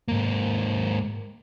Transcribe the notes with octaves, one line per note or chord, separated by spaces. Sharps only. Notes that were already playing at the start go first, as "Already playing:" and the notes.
G#2 A#3